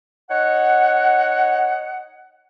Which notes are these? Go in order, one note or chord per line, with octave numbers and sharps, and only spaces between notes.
D#4 C#5 F#5